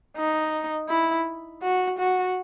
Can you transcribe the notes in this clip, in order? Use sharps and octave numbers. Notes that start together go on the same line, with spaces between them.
D#4
E4
F#4
F#4